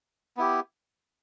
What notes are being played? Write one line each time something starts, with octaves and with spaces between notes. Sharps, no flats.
B3 E4 G4